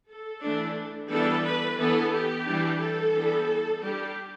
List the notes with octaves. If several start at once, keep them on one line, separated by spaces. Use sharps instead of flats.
A4
E3 A3 D4
E3 G3 B3 D4 A4
B4
E3 B3 D4 A4
G4
E3 G3 D4
A4
E3 G3 B3
G3 D4 G4